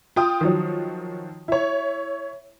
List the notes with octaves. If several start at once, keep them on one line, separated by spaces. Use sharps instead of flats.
F4 G5 D#6
D#3 F3 F#3
E4 C#5